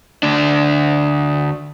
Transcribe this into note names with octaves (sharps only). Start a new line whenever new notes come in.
D2 D4